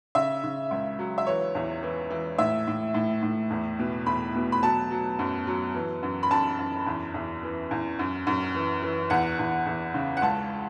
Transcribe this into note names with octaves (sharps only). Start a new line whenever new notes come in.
C#3 E5
C#3
C#2
F#3
E5
E3 C#5
E2
E3
E3
A2 E5
A2
A2
A2
E2
B2
E2 B5
B2
B5
F#3 A5
F#3
F#2
F#3
E3
F#2
B5
F#2 A5
F#2
E2
E2
E3
E2
F#2
F#2
E3
E3
E2 F#5
E2
E2
C#3
F#5
C#2 A5